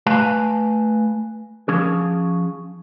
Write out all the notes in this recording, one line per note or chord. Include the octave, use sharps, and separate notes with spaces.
A3 B4 F5 G#5
F3 C#4 G#4